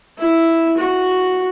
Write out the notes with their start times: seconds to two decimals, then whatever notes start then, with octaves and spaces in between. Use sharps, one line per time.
0.18 E4
0.78 F#4